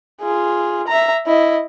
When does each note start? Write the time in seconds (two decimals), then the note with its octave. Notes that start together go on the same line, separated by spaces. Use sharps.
0.22 F4 G#4
0.87 E5 A#5
1.26 E4 D#5